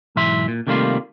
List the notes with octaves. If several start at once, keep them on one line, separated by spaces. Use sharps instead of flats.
B1 G#2 E3 E5 C6
A#2
C3 D#3 G3 A3 A#3 F4